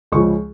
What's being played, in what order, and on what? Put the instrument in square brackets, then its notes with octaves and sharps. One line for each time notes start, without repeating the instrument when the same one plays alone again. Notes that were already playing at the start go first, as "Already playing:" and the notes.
[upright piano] C#2 C#3 F3 C#6